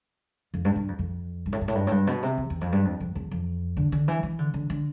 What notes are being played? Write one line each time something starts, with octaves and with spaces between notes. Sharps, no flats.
F2
G2
G2
F2
F2
G2
A2
G2
A2
G2
A2
G2
B2
C3
E2
E2
F2
G2
F2
F2
E2
F2
D3
D3
E3
E3
D3
D3
D3